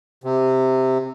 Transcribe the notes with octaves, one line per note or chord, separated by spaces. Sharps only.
C3